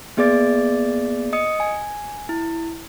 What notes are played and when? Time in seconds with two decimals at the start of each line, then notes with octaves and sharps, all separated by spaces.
0.17 A#3 B3 G#4 D5 D6 A6
1.33 D#5 D#6 C#7
1.60 G#5
2.29 E4